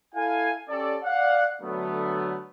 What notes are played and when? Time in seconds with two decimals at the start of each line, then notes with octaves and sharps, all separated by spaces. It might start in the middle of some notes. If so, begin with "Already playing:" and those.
0.15 E4 A4 F5 G#5
0.69 C#4 G4 A4 D5
1.04 D5 F5 F#5
1.62 D3 F#3 A3 B3